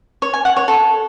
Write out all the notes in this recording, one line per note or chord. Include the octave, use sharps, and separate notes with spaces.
C#5
G#5
F#5
C#5
A4